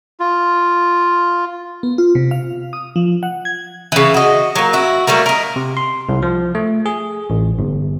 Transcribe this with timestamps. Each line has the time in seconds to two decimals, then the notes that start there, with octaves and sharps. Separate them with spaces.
0.20 F4
1.83 B3
1.98 F4
2.15 C3
2.31 F5
2.73 D#6
2.96 F3
3.23 F#5
3.45 G#6
3.92 C#3 E3
4.14 F#4 D#5
4.55 F#3 A#3
4.73 E4 F#4
5.07 F#3 G3 A3 A#3
5.26 A#4 D#5
5.56 C3
5.77 C6
6.09 C2
6.22 F3
6.55 A3
6.86 G#4
7.30 A1
7.59 G1